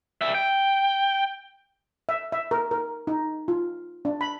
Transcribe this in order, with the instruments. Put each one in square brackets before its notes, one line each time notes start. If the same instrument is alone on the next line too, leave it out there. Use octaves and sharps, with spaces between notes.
[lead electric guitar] G3 E5
G5
[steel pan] E5
E5
A#4
A#4
D#4
F4
D4
B5